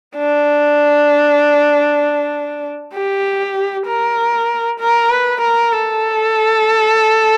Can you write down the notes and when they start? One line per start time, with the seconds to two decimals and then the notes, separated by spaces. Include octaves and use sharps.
0.17 D4
2.94 G4
3.87 A#4
4.80 A#4
5.10 B4
5.42 A#4
5.72 A4